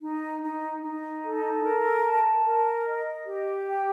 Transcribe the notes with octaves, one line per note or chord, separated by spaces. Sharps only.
D#4
D#4
D#4
A4
A#4
A5
A#4
D#5
G4
G5